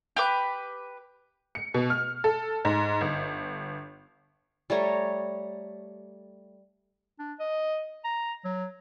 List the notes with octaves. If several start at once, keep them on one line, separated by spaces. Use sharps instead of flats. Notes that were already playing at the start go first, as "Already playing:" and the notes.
G4 B4 D6
C#7
B2
F6
A4
G#2
G1
G3 A3 C#5 A#5
D4
D#5
A#5
F#3